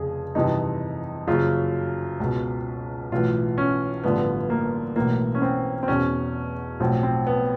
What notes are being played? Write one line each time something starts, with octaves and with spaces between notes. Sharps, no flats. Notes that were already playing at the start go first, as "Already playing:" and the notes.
Already playing: F1 F2 C#3 G#4
G1 F2 C3 E3 D#4
F#1 F#2 C#3 F4
C#2 B2
B1 A2 E3 F4
C#4
A1 G2 D3 F3 B3
A#3
B1 A2 E3 A#3
C#4
C4
C4
E2 B2 C#4
B1 A2 F3 C4
C4
B3